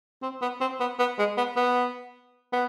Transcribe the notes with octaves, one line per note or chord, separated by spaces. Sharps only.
C4
B3
C4
B3
B3
G#3
B3
B3
B3